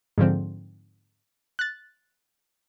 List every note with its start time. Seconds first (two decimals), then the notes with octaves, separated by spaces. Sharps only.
0.18 G#2 D3 F3 C4
1.59 F#6 A6